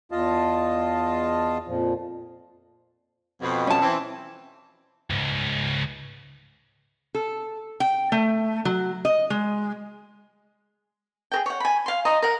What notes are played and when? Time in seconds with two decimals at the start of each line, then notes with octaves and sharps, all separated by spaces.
0.12 E2 F4 D#5 F5 A5
1.67 F2 A#2 F3
3.41 F2 B2
3.67 C#4 A5
3.81 E3 C4
5.10 C#2 G#2
7.15 A4
7.80 G5
8.12 A3
8.65 F#3
9.05 D#5
9.30 G#3
11.32 G#4 A#4 G5
11.46 C#5 F#5
11.60 G#5 B5
11.86 F5 C6
12.05 D#5 A#5 C6
12.22 A#4 F#5